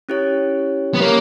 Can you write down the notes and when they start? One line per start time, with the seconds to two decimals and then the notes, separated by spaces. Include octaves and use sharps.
0.09 C#4 E4 G4 C#5
0.94 B3
1.01 A#3 C#4 G4 C#5